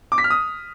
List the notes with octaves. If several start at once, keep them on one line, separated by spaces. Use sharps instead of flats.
D6
B6
F6
D#6